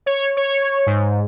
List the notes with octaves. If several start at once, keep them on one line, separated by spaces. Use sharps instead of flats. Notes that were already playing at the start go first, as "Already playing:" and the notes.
C#5
C#5
G#2